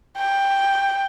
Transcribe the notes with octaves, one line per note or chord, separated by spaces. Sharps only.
G5